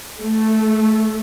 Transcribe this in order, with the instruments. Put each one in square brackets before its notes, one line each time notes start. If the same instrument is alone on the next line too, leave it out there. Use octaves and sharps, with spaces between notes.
[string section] A3